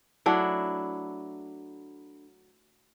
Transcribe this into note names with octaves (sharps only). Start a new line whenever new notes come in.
F#3 A3 D4 E4